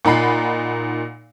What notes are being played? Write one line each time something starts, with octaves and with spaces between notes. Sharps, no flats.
A#2 D#4 F#5 B5 C7